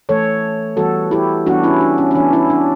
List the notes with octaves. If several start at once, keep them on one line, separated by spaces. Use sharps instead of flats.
E3 A3 A4 C#5
E3 G3 B3 F#4 A4
E4 G4
E3 G3 B3 D4 F#4
C#4 E4
D4
C#4
C#4
E3 B3 D4
C#4 E4
D4